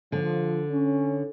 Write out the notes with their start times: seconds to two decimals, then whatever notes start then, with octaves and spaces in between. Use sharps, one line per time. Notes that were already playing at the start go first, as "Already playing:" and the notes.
0.12 D3 F3
0.71 C#4